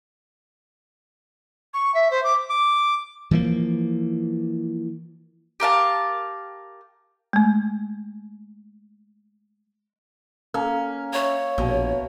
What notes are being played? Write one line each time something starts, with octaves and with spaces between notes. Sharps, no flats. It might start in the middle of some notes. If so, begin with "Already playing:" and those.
C#6
E5
C5
D6
D6
E3 F3 G#3 A#3
G4 A#4 F5 A5
G#3 A3
A#3 C#4 A4
C#5 E5 C#6 E6
A#1 B2